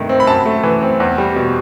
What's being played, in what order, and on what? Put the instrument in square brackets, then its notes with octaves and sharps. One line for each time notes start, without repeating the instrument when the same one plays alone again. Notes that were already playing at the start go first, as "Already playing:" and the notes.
Already playing: [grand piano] G2 C3 D#3 A3
C4
B5
F#2 A5
A3
E3
C4
E2
G3
B2